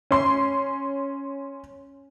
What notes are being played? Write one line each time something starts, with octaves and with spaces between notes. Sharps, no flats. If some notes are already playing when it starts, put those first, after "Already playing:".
C#4 C6